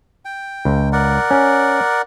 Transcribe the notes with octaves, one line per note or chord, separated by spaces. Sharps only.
G5
C#2
A#4 D5 F#5
C#4